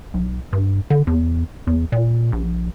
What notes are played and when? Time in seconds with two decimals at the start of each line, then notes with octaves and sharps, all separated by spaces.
0.14 B1
0.53 G2
0.90 D3
1.07 E2
1.67 E2
1.92 A#2
2.32 A#1